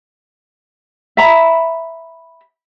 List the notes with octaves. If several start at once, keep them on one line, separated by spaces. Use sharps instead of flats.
E5 A#5 B5